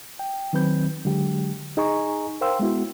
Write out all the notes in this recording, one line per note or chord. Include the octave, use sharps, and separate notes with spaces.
G5
D#3 F#3 C4 B4 G6
D3 F#3 G#3 G4
D#4 G#4 D#5 G#5 A#5 C#6
A#4 C5 F5 G5 C6 E6
G#3 B3 E4 F#4